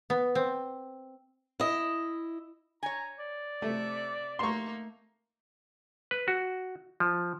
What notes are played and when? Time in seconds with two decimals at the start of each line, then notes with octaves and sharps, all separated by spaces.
0.10 B3
0.35 C4
1.60 E4 D#5
2.83 C#5 G#5 A#5
3.18 D5
3.62 C3 A3 E5
4.39 A3 A#3 D#4 C6 C#6
6.11 B4
6.28 F#4
7.00 F3